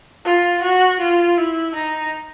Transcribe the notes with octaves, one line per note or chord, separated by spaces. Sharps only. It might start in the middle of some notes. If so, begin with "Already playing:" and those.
F4
F#4
F4
E4
D#4